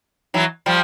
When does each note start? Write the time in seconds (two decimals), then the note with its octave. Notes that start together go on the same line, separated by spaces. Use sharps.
0.34 E3 F#3
0.66 F3 G3